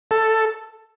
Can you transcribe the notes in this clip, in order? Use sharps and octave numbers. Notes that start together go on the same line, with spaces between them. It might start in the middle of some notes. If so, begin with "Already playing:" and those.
A4